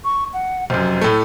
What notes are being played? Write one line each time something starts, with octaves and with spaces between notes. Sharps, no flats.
C#6
F#5
F1 F#2 C5
A2 A3